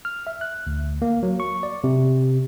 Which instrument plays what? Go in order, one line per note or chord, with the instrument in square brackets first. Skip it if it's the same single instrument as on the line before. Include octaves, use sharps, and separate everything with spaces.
[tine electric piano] F6
E5
F#6
D2
A#3
F#3
C#6
D5
C3